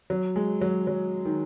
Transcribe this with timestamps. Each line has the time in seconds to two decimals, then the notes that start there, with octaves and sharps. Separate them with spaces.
0.10 F#3
0.36 G#3
0.61 F#3
0.87 F#3
1.25 D#3